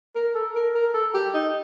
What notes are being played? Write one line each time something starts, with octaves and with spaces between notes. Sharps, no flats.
A#4
A4
A#4
A#4
A4
G4
D#4